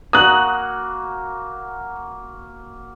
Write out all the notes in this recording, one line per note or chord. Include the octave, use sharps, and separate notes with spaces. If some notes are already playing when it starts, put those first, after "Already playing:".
A#3 F#4 D#6 F#6